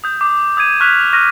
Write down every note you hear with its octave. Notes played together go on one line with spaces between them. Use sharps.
D#6 G6
D6
D#6 G6 G#6 D#7 E7
C#6 F6 F#6 G#6 B6 F7
D#7 F7
C#6 F6 F#6 A#6 D#7